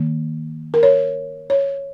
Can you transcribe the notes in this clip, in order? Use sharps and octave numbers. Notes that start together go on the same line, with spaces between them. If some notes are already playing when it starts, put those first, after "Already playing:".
Already playing: D#3 A#3
A#4
C#5
C#5